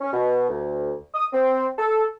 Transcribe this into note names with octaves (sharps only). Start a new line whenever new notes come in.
C#4
B2
D2
D#6
C4
A4